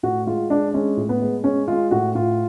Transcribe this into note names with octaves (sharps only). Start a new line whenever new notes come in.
A2 F#4
G#3 F4
G#3 D4
G#3 C#4
A2
B3
G#3
G#3 C#4
G#3 F4
A2 F#4
A2 F4